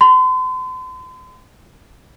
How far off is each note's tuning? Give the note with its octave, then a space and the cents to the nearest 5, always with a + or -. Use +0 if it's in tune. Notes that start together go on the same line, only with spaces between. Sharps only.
C6 -40